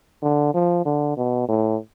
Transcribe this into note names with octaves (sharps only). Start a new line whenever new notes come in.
D3
F3
D3
B2
A2